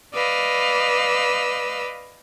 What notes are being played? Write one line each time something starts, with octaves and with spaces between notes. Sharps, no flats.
B4 D5 D#5 F5 E6